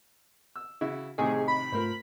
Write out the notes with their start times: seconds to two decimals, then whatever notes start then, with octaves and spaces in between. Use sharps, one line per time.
0.56 E6
0.81 C#3 E4 F#4
1.18 A2 C3 D#3 C4 G#4 D#5
1.48 B5
1.72 G#2 A3 F4 A#4 C5